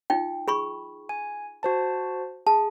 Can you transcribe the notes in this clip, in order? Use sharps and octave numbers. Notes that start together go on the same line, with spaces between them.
D#4 F4 G5
G#4 B5 C#6
G#5
F#4 C5 A5
G#4 A5